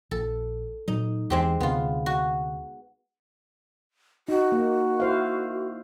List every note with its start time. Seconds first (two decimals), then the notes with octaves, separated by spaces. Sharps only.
0.11 A#1 A4
0.88 A#2 F#3 D#4
1.30 E2 E3 G#3 C4 G4
1.60 D2 C3 B3 F4
2.06 F#4
4.28 D#4 F#4
4.52 A#3
5.00 E4 C5 F5